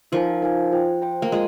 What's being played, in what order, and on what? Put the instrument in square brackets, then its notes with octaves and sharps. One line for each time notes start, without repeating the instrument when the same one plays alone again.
[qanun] F3 [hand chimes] D#4 A#4 F5 G#5
[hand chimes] D#4 A#4 F5 G#5
F4 C5 G5
F4 C5 G5
[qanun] A#3
[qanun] G#3 [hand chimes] F4